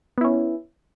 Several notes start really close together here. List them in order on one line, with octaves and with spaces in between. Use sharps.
B3 E4 C#4